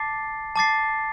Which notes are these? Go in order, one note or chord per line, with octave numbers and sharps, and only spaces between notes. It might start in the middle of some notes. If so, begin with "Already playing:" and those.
Already playing: A5 D6 A6 C7
A5 D6 A6 C7